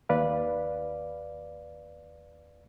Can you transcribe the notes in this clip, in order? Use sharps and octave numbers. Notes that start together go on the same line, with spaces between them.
D#2 B4 D5 F5